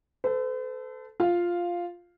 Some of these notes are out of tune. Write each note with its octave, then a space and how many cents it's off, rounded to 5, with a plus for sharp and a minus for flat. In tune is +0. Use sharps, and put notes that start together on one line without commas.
A4 +0 C5 -45
F4 +0 F5 +0